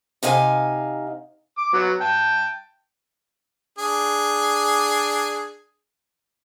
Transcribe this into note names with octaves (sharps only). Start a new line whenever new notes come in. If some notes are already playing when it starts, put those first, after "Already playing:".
C3 D#4 F5 G#5
D6
F#3 B3
G5 A5
D4 G#4